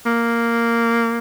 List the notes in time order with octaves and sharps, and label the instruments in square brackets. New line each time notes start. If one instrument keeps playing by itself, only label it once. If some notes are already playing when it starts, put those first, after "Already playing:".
[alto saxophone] A#3